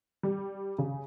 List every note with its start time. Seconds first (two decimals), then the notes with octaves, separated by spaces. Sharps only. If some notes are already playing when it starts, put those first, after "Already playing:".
0.23 G3
0.78 C#3